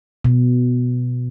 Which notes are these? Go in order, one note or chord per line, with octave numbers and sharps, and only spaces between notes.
B2